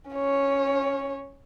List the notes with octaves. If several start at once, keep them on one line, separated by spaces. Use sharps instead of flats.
C#4 C#5